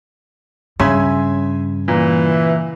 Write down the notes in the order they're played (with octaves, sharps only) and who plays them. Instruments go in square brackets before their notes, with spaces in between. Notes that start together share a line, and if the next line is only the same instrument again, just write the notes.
[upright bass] G2 [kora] C#3 [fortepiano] E5 G#5 C6
[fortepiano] A#2 [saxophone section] E3